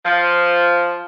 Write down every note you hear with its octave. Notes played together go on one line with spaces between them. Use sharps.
F3